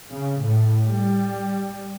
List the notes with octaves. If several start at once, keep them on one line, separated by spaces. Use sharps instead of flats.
C#3
A2
G3